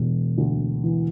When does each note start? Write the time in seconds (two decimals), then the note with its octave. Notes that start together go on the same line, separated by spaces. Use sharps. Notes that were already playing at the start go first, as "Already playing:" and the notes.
Already playing: E1
0.38 D2
0.84 E3